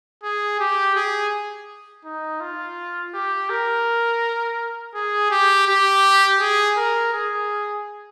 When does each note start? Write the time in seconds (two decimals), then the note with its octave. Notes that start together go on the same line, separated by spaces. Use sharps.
0.23 G#4
0.60 G4
0.96 G#4
2.05 D#4
2.40 F4
3.14 G4
3.50 A#4
4.94 G#4
5.31 G4
5.67 G4
6.40 G#4
6.77 A#4
7.13 G#4